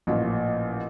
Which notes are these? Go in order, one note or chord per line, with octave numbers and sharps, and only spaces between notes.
A1 A#2 F3